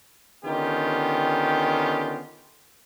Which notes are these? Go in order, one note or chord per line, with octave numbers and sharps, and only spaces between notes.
D3 D#3 B3 C#4 F4 G4